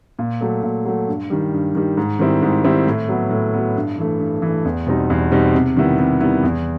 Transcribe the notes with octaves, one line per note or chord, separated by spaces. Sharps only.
A#2
F#3 A3
A#2
F#3 A3
G2
D#3 G3
G2
D#3 G3
G#2
D#3 G3 C4 E4
G#2
D#3 G3 C4 E4
A2
F#3 B3
A2
F#3 B3
G2
E3 A3
G2
E3 A3
E2
B2 G3 C4 D#4
E2
B2 G3 C4 D#4
C3
D#3 G3 B3 E4
C3
D#3 G3 B3 E4
E2